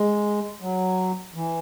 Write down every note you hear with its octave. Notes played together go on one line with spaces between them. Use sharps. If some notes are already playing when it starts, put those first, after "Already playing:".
Already playing: G#3
F#3
E3